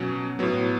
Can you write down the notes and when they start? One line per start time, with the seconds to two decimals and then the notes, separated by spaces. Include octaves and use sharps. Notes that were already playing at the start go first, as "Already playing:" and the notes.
Already playing: B2 F#3 C#4
0.39 A2 F#3 B3